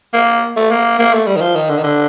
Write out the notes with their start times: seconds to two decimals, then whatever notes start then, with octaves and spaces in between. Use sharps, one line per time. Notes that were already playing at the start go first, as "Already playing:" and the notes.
0.14 A#3
0.56 A3
0.71 A#3
0.99 A#3
1.14 A3
1.27 G3
1.37 D#3
1.41 F3
1.55 D#3
1.69 D3
1.78 D#3
1.84 D3